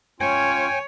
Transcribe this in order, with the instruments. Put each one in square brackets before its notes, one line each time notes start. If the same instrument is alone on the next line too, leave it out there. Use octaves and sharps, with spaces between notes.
[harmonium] C#4 F4 [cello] C#5 [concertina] G5 G#5